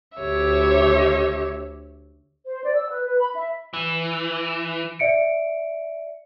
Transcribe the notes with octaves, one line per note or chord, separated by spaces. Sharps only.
D2 G4 C#5 E5
C5
D5
E6
B4
B4
B5
E5
E3
D5 E5 C#7 D7